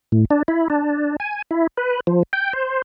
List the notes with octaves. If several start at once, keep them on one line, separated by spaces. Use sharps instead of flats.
A2
D4
E4
D4
G#5
E4
B4
F3
G5
C5